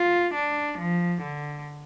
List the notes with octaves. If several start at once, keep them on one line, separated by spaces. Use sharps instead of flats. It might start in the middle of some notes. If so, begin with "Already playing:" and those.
Already playing: F4
D4
F3
D3